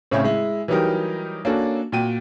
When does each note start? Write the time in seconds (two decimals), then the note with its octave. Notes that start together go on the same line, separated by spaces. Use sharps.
0.11 A2 C#3 C4 C#4 E5 C#6
0.24 G#3 E4
0.68 E3 F#3 G3 D#4 G4 A#4
1.45 A#3 C#4 D4 F#4 A4
1.92 A#2 F#4 G5 D#7